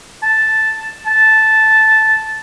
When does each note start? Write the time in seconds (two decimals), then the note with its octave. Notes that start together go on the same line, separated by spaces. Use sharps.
0.23 A5
1.06 A5